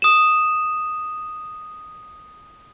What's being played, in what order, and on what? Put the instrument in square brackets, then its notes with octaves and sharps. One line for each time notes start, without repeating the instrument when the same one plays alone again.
[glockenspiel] D#6 E7